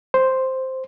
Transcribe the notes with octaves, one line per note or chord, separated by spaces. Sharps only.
C5